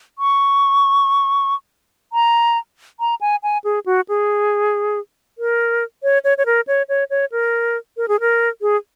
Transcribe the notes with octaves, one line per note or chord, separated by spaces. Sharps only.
C#6
A#5
A#5
G#5
G#5
G#4
F#4
G#4
A#4
C#5
C#5
C#5
A#4
C#5
C#5
C#5
A#4
A#4
G#4
A#4
G#4